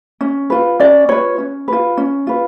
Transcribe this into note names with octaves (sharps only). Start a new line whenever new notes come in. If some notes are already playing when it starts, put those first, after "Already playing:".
C#4
F4 B4
C#4 D5
F4 B4 C#5
C#4
F4 B4
C#4
F4 B4